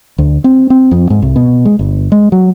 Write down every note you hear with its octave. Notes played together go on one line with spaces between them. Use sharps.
D2
C4
C4
F2
G#2
C2
B2
G#3
G1
G#3
F#3